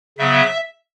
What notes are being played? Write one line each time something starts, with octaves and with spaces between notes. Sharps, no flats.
C#3 F#3 B3 E5